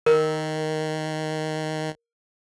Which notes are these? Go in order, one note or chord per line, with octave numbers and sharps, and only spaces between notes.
D#3 A#4